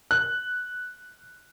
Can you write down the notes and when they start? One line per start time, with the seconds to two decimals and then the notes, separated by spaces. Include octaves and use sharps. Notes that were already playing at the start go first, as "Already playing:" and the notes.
0.11 F#6